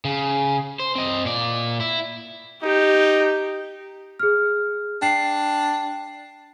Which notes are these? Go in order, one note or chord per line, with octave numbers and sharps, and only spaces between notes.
C#3
C5
C4 D#5
A#2 D5
E4
D#4 G4
G#4 F6
D4 G5 C7